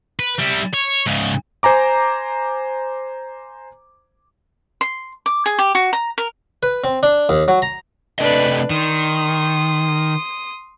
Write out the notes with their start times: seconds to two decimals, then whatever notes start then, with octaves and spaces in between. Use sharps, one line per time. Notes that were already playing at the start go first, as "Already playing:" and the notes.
0.19 B4
0.39 G3 E4
0.73 C#5
1.06 G#2 C#3
1.63 C5 G#5 A#5 D6
4.81 C6
5.26 D6
5.46 G#4
5.58 G4
5.75 F#4
5.93 A#5
6.18 A#4
6.63 B4
6.84 C4
7.03 D4
7.29 D#2
7.48 F#3
7.62 A#5
8.19 C3 A3 D4 B4 D#5
8.70 D#3 C6 D#6